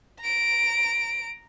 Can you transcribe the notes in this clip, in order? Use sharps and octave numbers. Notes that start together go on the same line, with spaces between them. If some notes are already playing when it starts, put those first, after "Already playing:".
A#5 D7